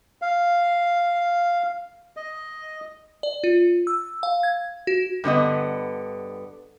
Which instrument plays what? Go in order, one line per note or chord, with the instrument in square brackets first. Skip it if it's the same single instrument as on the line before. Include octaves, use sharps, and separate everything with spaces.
[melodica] F5
D#5
[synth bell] D5
F4
E6
F5
G#6
F#4
[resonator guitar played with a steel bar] G2 D3 B3 D#5